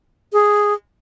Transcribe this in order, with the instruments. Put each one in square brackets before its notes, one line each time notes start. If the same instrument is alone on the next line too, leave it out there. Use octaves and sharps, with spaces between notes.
[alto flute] G#4